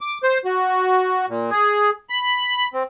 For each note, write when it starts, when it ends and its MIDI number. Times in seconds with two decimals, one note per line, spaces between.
0.01 0.18 86
0.23 0.38 72
0.45 1.26 66
1.28 1.50 46
1.51 1.90 68
2.10 2.66 83
2.74 2.83 60